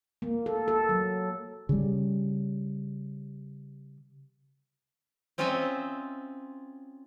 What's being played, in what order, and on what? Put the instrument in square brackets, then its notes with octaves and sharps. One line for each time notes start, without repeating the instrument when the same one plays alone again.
[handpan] A#3
A4
A4
F#3
[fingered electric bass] C#3 G3
[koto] C4 C#4 F4 C5 D#5 E5